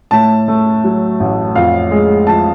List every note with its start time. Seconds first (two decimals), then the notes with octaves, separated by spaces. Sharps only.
0.11 A2 A5
0.48 A3
0.84 F#3
1.20 A1
1.55 F2 F5
1.91 G#3
2.27 F3 A5